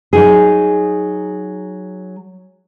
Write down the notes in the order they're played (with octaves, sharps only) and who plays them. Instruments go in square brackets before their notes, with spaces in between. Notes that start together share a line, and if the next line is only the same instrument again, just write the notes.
[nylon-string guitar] F#3 D#4 G#4